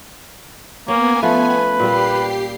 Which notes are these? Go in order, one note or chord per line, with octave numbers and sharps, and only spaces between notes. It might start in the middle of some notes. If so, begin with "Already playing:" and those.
A#3 B3 C#4 G#5
F3 A3 B4
A#2 G3 G4 C7